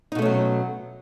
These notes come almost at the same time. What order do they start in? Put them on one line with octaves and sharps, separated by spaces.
D#4 B2 A3 C#4 F#3